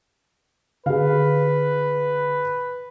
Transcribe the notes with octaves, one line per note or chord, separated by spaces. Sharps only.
D3 G#4 B4 F5